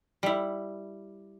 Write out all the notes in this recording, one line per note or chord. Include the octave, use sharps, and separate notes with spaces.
G3 E4